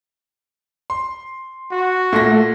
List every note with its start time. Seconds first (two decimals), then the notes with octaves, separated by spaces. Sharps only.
0.90 C6
1.72 F#4
2.13 A#2 A3 A#6